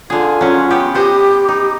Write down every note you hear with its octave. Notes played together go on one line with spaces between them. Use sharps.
D3 F4 G#4
F#3 C#4
B3 G4
B3 G4 C5 D#5
D#4